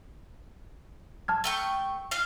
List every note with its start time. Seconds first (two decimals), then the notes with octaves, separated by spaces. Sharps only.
1.28 A5 F6 G#6
1.44 A3 G5 C#6
2.11 F4 F5